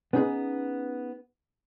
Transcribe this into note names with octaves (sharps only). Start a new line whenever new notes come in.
B3 C#4 D#4 F#4 G#4 B4